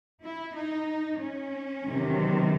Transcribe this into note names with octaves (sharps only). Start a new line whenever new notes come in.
E4
D#4
C#4
E2 C3 D#3 F#3